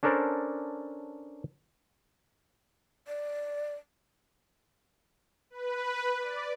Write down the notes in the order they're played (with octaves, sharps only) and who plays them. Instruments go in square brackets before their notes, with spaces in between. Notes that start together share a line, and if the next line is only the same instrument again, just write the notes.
[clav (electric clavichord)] C#4 D4 A4 A#4 C5 D5
[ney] D5
[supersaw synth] B4
D5